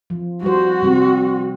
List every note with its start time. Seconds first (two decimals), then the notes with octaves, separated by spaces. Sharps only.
0.10 F3
0.43 G3 F#4 C5
0.82 C3 G3 C4